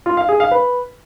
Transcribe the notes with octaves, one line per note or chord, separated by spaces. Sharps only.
F4
F5
G#4
F5
B4